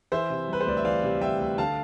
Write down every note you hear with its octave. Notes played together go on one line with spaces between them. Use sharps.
E3 C5 E5
C3
G3 B4
C5
D2 D5
E5
E3 D5 F5
C3
G3 E5 G5
D2
D3 F5 A5